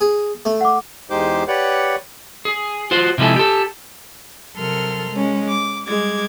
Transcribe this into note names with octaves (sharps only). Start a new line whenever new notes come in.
G#4
A3
F#5 D6
E2 G#3 D#4 G4 C5 D6
G4 B4 C#5 D5 F#5
G#4
F4 F#4 C5
C3 F3 G#3 E4 A4
G4 A4
C3 F#3 A4 A#4 C6 F6
G#3 C#4
D6
G3 G#3 D6 G#6